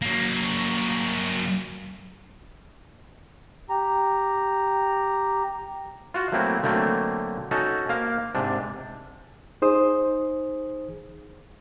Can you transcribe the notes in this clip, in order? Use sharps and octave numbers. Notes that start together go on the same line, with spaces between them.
F#3 A#3
G4 A#5
F4 F#4
F#3 A3 A#3 C4 E4 F#4
D3 F#3 A3 A#3 C4
C#4 D#4 F#4 A4
A#3 C5 F5
G#2 C3 D4
D#4 G#4 C5 D#6